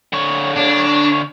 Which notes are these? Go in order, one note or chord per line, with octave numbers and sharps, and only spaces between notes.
D3 C#5
D4